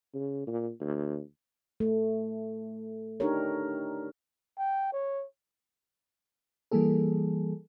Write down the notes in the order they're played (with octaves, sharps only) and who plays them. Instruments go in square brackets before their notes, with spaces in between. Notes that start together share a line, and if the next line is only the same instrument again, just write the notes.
[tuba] C#3
A#2
D2
[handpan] A3
D4 D#4 G4 A#4 C#5
[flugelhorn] G5
C#5
[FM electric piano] E3 G3 A#3 G#4 A4